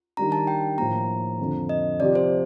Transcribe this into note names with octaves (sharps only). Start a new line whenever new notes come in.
D#3 G3 D4 A#5
A5
G5
A2 F3 A#3 A#5
F2 D3 F3 C4
D#5
C3 F3 C4 G4 D5
C5